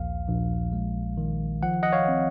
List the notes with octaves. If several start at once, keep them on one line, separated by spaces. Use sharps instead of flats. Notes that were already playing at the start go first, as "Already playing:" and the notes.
Already playing: A#1 D#2 F5
A#1
G#3
D#3
F3 F#5
D#5 F#5
C#5 F5
C4